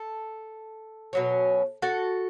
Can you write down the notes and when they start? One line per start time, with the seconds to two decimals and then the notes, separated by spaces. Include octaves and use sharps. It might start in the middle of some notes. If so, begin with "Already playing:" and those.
Already playing: A4
1.13 B2 F#3 C#4
1.82 F#4 A4